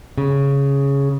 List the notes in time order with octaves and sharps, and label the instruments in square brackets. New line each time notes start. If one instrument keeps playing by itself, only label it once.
[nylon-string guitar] C#3